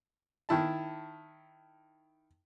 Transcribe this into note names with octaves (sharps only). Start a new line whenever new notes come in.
D#3 E4 A5